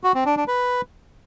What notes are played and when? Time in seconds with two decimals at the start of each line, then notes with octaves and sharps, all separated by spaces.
0.04 F#4
0.15 C4
0.26 D4
0.37 D4
0.48 B4